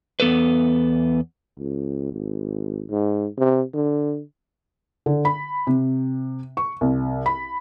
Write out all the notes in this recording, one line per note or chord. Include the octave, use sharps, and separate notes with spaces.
E2 B3 A4 B4
C#2
G#1
G#2
C3
D3
D3
B5
C3
C#6
C2
B5